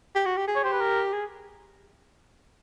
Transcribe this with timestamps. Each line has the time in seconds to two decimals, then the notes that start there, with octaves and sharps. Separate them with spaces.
0.15 G4
0.25 F#4
0.37 G4
0.47 G#4
0.56 C#5
0.64 G4 C5
0.73 B4
0.81 A#4
1.13 G#4